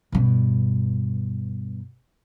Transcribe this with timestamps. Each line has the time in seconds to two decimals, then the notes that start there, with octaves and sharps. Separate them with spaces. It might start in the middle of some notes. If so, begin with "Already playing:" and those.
0.12 G2 B2